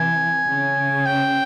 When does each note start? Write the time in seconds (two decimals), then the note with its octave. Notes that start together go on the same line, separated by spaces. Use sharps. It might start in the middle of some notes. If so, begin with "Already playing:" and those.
Already playing: C3 E3 G#5
0.48 C#3
1.06 G5